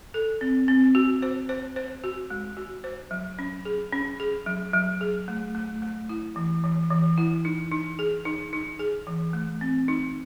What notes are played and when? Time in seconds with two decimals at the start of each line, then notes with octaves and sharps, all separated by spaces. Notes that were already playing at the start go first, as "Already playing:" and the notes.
0.14 A4
0.41 C4
0.68 C4
0.95 F#4
1.22 C5
1.49 C5
1.76 C5
2.04 F#4
2.30 G#3
2.57 F#4
2.84 C5
3.11 F#3
3.39 C#4
3.65 G#4
3.92 C#4
4.20 G#4
4.46 F#3
4.74 F#3
5.01 G#4
5.28 A3
5.55 A3
5.82 A3
6.09 E4
6.36 E3
6.64 E3
6.90 E3
7.18 E4
7.45 D#4
7.72 D#4
7.99 G#4
8.25 D#4
8.53 D#4
8.79 G#4
9.07 E3
9.33 A3
9.61 C4
9.88 D#4